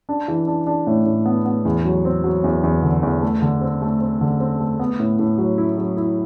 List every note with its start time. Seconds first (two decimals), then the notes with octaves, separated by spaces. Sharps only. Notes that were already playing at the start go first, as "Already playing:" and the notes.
0.09 D4
0.28 E3
0.48 D4
0.67 D4
0.87 A2
1.06 A2
1.26 B3
1.46 B3
1.65 E2
1.85 F#3
2.05 C4
2.24 F#3
2.44 E2
2.64 E2
2.83 D3
3.03 E2
3.22 A3
3.42 D3
3.61 C4
3.82 A3
4.01 C4
4.21 D3
4.40 C4
4.60 A3
4.80 B3
5.00 A2
5.19 A2
5.38 F#3
5.58 E4
5.78 F#3
5.97 E4